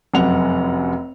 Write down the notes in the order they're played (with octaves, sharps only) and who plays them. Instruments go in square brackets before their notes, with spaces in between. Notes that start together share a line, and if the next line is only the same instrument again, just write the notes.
[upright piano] F1 F#2 F#5 F7